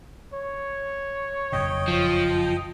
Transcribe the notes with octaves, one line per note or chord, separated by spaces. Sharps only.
C#5
F#1 F2 A#2 D#5 G5
F3